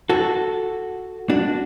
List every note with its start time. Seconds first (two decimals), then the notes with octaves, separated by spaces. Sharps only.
0.09 F#4 A4
1.30 D4 F#4